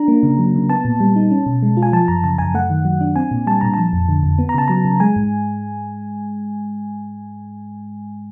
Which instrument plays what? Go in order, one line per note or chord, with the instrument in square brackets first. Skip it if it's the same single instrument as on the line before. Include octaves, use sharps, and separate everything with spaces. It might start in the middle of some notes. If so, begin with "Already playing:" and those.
Already playing: [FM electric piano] D4 A#5
A#3
C#3
F#3
C#3
B3 A5
A#2
G3
D#4
C#4
B2
G#3
F4
G#5
F3 A5
F#2 A#5
C#3 A5
F#2 G#5
A3 F#5
D#3
F#3
D4
C4 G#5
A#2
G3 A5
A#2 A#5
F3 A5
F2
D3
F2
B3
A#5
C#3 A5
F#3 A#5
C#3
G#3 G#5
G#2